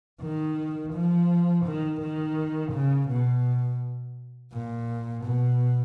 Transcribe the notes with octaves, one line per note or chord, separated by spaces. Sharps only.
D#3
F3
D#3
D#3
C#3
B2
A#2
B2